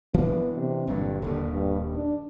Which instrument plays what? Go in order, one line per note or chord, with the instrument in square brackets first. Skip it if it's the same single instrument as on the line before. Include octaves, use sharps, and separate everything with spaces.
[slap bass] E3 D4 [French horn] B3
[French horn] C3
[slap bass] G1 A#2 F#3 [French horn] G2
[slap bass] D#1 D#2 B2 [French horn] D3
[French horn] G2
D4